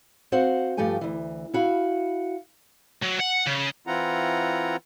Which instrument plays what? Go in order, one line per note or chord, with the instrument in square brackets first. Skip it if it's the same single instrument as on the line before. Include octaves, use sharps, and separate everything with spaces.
[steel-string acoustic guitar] C4 F#4 C5 F5 F#5
G2 F3 A3 G4 G5 G#5
D2 E3
E4 F#4 F5
[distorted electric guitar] F#3
F#5
C#3
[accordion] E3 C4 E4 F4 F#5 A#5